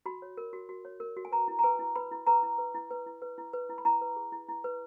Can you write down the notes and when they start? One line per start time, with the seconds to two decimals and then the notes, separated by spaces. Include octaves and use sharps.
0.06 F#4 B5
0.22 C#5
0.37 A#4
0.53 F#4
0.69 F#4
0.85 C#5
1.00 A#4
1.17 F#4
1.25 G#5
1.32 B4 A#5
1.48 E4
1.59 A#5
1.63 B4 G#5
1.79 E4
1.96 B4 B5
2.11 E4
2.27 B4 A#5
2.43 E4
2.58 B4
2.75 E4
2.91 B4
3.06 E4
3.22 B4
3.38 E4
3.53 B4
3.70 E4
3.78 B5
3.85 E4 A#5
4.01 B4
4.16 G#4
4.32 E4
4.49 E4
4.64 B4